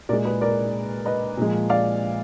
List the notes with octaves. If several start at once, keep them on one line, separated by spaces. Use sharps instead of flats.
A#2 G#3 A#4 D5
G#4 B4
A#4 D5
B4 D#5
A#2 F3 G#3
D5 F5